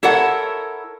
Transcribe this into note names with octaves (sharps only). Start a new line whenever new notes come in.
E4 A4 A#4 C#5 F#5